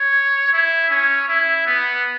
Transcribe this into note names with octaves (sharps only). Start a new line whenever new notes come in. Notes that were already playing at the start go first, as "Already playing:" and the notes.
Already playing: C#5
E4
C#4
E4
B3